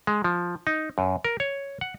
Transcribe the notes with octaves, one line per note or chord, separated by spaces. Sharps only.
G#3
F3
D#4
F#2
A#4
C#5
F#5